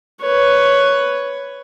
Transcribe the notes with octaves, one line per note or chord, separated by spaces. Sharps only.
B4 C#5